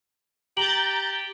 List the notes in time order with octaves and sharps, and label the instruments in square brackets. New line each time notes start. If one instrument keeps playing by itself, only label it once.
[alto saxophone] G4 [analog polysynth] A#5 G6 A6 [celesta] F#7 G7